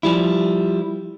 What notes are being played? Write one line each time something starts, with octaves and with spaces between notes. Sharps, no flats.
F3 G3 E4